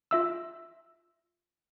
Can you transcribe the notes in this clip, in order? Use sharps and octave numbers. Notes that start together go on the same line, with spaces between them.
F4 E5 E6